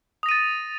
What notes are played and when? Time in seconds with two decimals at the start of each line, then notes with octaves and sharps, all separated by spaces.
0.23 D#6
0.26 A#6
0.29 D#7
0.31 A6